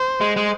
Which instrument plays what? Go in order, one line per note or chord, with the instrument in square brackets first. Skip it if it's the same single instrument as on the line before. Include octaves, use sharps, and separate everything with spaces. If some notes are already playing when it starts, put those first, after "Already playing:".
Already playing: [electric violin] C5
[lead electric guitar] G#3
G#3